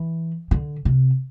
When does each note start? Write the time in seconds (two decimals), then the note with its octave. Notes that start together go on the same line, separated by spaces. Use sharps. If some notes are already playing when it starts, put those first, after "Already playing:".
Already playing: E3
0.51 D3
0.85 C3